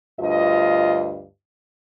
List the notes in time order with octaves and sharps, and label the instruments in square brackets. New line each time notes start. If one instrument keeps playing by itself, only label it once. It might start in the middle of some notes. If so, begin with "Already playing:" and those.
[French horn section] D2 G2 F4 D#5